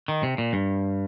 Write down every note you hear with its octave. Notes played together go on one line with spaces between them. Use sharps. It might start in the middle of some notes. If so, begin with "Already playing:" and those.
D#3
C3
A#2
G2